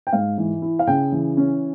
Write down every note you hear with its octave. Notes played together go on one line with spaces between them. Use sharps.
G5
G#2 F5
E3
E4
F5
C#3 G5
E3
C#4